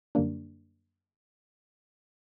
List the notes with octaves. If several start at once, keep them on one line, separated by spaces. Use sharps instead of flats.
F#2 D3 G3 A#3 D4